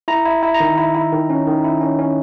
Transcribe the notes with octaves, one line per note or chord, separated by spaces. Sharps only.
E4 A#5
E4
E4
A#5
D#3
E4
E4
D#3
C#4
D#3
E4
C#4
C#4